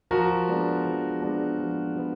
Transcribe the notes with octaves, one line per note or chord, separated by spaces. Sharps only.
F3 F#4 A#4
G#3 B3 D4
F3
G#3 B3 D4
F3
G#3 B3